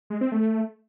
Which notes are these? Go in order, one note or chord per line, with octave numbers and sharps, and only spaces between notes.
G#3
C4
A3